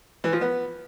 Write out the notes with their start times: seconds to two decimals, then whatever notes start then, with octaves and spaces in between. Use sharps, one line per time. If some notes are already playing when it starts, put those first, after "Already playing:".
0.24 E3
0.33 F3
0.41 B3